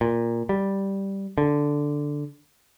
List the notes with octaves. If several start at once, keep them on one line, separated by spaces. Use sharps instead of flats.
A#2
G3
D3